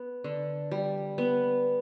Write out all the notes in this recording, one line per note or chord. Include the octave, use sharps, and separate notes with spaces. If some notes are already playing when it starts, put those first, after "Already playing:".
Already playing: B3
D3
G3
B3